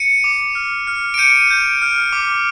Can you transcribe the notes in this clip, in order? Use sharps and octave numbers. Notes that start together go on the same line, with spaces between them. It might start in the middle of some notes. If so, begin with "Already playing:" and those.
Already playing: C#7 D#7
D6
F6
F6
D7
G6 C#7 D#7
G6
F6
D6